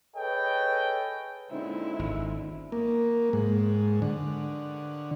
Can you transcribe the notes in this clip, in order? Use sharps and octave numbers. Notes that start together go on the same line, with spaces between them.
G#4 A4 B4 C#5 D#5 G5
A#2 D3 G#3 C#4 D#4 E4 C5
G#1
A#3
G#2
D3